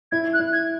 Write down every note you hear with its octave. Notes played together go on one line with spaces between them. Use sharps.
E4 G#6
F#6
E4
G#6